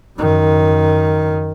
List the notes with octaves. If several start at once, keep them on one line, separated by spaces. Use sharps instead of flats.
F#2 D#3